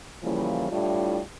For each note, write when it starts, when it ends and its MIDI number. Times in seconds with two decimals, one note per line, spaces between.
0.23 0.67 49
0.23 0.67 52
0.23 0.67 53
0.23 0.67 55
0.23 0.67 58
0.23 0.67 64
0.70 1.19 45
0.70 1.19 55
0.70 1.19 62
0.70 1.19 64
0.70 1.19 65